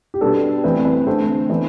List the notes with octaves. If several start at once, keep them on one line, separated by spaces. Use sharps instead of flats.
G4
B2 G3 B3 D4 A4
E3 A3 C4 B4
B4
D3 A3 C4 C5
E3 B3 D4 B4